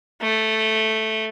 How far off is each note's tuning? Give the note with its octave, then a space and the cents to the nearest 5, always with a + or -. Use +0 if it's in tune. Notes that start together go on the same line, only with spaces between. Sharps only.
A3 -5